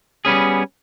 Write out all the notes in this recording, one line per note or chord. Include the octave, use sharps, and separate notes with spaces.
G3 B3 C#4 G#4